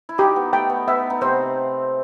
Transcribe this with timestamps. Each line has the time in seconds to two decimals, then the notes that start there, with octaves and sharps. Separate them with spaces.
0.09 E4
0.18 D#3 D#4 G4
0.36 B3
0.53 A3 G5
0.70 B3
0.88 B3 E5
1.10 D#4
1.21 C3 C4 C5